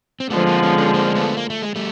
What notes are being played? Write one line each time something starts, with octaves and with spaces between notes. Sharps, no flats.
C4
D3 F3 G#3 A3 B3
A#3 C4
B3 C#4
B3 C#4
A#3 C4
C4
A3 B3
A#3
A3
G#3
G3 A3